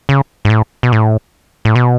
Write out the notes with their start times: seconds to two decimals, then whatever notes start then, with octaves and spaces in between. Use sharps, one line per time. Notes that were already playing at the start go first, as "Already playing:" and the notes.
0.09 C#3
0.45 G#2
0.50 A2
0.83 B2
0.92 A2
1.65 A2
1.75 B2